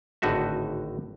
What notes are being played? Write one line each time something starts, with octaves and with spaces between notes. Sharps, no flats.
G#1 A2 D3 D#4 F#4 E5